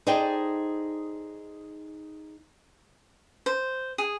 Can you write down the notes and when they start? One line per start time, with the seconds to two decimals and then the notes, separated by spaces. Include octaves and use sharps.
0.07 D#4 G#4 A4 C5 D5 G5
3.46 C5
3.98 G#4